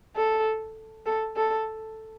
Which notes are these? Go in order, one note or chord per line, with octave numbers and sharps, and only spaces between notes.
A4
A4
A4